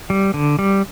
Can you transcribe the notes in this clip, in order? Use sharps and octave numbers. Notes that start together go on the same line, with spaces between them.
G3
D3
G3